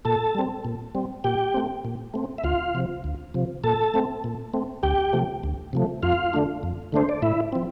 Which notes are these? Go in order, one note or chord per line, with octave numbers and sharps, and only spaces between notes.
A#2 A4 A5
G3 C4
A#2
G3 C4
A#2 G4 G5
A3 C4
A#2
A3 C4
E5
D2 F4 F5
C3 F3
D2
C3 F3
A#2 A4 A5
A3 C4
A#2
A3 C4
D2 G4 G5
C3 F3 A3
D2
C3 F3 A3
F2 F4 F5
D3 A3 D4
F2
D3 A3 D4 C5
D5
A2 E4 E5
F3 C4